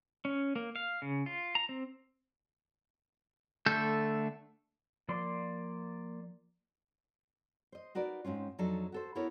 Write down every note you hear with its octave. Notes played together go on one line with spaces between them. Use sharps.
C#4
A#3
F5
C#3
F4
A#5
C4
D3 A3 A4 G6
F3 A#3 D5 C6
C5 D#5
D#4 F#4 A#4 B4 D5
G#2 C4 C#4 F4
F2 F#3 D4 D#4 A4
F#4 A4 C5
B3 E4 F#4 A4 A#4 C#5